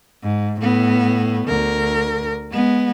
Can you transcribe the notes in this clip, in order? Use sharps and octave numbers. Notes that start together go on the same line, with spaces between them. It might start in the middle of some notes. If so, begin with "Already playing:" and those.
G#2
A2 B3
D2 A#4
G#3 B3